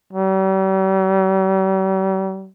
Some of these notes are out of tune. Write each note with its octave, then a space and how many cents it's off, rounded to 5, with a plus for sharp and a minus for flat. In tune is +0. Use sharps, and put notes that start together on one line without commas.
G3 -45